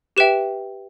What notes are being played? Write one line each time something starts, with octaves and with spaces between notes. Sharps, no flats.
G4 B4 E5 G5 E7